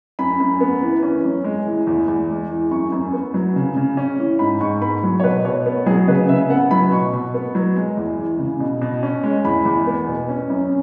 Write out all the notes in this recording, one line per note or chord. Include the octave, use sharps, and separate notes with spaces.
F#2 B5
F#2
B3
E3
C#4
F#2
G#3
E3
E2
E2
G#3
E3
F#2 C#6
F#2
B3
F#3
C#3
C#3
C#4
E3
G#2 B5
G#2 C#6
B3 B5
F#3
C#5
B2 B4
B2 C#5
B3
F#3 G#4
C#3 B4
C#3 E5
B3 F#5
F#3 B5
B2 C#6
B2
B3
F#3
G#3
E2
E3
C#3
B2
B2
C#4
G#3
E2 B5
E2
B3
B2
C#4
F#2